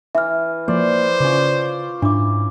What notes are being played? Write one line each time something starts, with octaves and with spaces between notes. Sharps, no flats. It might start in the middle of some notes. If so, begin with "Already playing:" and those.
E3 E5 F6
F3 A#3 C5 D5
C#3 C#4 F4 D5
G#2 D4 E4 D6